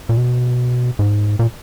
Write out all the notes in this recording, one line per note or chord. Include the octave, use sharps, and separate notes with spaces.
A#2
B2
G#2
A#2